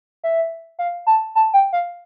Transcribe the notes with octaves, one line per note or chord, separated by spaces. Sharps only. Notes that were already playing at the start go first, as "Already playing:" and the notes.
E5
F5
A5
A5
G5
F5